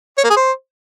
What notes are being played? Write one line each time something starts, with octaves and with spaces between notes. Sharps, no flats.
C#5
A#3
G#4
C5